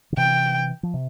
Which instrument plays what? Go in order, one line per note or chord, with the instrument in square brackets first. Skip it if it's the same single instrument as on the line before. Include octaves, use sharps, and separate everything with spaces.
[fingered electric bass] D3
[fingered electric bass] C3 E3 [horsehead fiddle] G5
[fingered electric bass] F3
C3